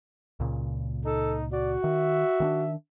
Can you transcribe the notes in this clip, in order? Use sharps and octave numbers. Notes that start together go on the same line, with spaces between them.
C#2 A#2 C#3
D#4 A4
F#4 D5
D#3 E5
D#3 C4 D4